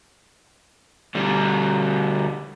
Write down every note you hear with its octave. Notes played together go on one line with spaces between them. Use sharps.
D2 G3